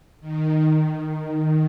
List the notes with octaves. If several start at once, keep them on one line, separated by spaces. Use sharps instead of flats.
D#3